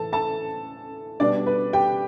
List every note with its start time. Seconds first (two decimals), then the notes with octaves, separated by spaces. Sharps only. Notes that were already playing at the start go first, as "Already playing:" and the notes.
Already playing: A2 E3 A3 A4 A5
0.13 A4 A5
1.20 B2 G3 B3 D4 D5
1.46 B4
1.73 G4 G5